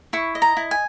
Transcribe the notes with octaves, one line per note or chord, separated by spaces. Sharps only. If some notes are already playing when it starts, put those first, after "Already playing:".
E4 C#6
D#5
A#5
E4
G#5